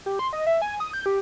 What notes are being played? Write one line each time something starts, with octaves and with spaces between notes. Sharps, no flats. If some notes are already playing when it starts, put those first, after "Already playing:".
G4
C6
D#5
E5
G#5
D#6
G6
G4